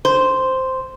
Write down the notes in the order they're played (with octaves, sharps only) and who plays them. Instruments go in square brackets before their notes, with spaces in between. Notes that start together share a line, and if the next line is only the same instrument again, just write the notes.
[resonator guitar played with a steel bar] C5